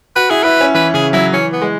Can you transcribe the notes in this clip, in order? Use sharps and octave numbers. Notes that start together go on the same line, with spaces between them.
F#4 B4
E4 G#4
E4 B4
C#4
E3 B4
C#3 G#4
F#3 E4
E3 C#4
B3
G#3